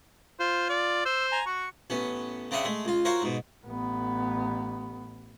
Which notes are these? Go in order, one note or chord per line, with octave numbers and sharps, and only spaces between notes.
F4 C5
D5
C5 E6
G#5 A#5
F#4 C#6
A1 B3 C#4
C#3 C4 D4 D#5 E5 F#5
G#3 A3
C#2 F4
F4 F#4 A#4 C5 C#5
G#2 B2
A1 B3